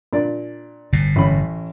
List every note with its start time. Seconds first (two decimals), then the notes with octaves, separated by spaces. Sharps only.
0.13 A#2 D4 D5
0.93 G1 A2
1.16 A1 C#4 B5